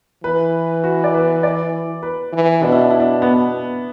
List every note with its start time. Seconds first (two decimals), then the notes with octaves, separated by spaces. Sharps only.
0.24 E3 B4
0.84 F#4
1.04 D5
1.14 B4
1.43 D5
2.03 B4
2.33 E3
2.63 B2 D4
2.72 E4
2.82 D4
2.90 E4
3.00 D4
3.22 B3